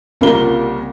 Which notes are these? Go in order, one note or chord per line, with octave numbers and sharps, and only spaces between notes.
C2 C#3 A#3 F4 A#4 G7